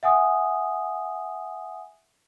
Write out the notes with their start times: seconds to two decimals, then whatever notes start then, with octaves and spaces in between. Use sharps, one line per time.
0.03 E5 F#5 G#5 D#6